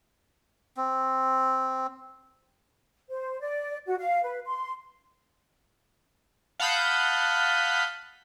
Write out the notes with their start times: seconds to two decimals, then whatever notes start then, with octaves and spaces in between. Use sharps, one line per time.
0.77 C4
3.10 C5
3.41 D5
3.87 F#4
3.99 F5
4.24 B4
4.46 C6
6.60 F5 F#5 A5 B5 D#6 G6